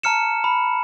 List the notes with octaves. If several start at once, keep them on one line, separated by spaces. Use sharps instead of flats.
A5 A#5 F6 C#7 E7
B5